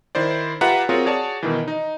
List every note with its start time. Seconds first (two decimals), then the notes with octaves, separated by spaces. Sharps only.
0.15 D#3 E4 C5 D5
0.61 F4 G4 B4 E5 F#5 A#5
0.89 C4 F4 F#4 G#4 A#4 C#5
1.05 F#4 G#4 C#5 D5 A5
1.43 B2 D#3 E3
1.68 D#4